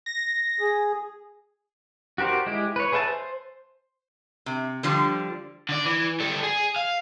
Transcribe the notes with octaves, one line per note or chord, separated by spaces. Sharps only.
A#6
G#4
F#4 G4 A#4 C5 D5
G#3 E4 G4
B4 C#5
G#4 B4 E5 F#5 A5
C5
C3
D3 F3 G3
D3 D5
E3
G3 A4
G#4
F5